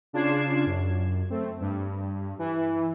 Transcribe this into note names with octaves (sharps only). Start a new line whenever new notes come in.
C#3 D4 F4 G#6 C7 E7
F#2
A3 C4
G2
E3